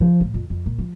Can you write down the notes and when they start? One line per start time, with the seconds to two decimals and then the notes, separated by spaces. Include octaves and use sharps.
0.01 F3
0.20 A2
0.34 F2
0.50 F2
0.66 A#2
0.78 F3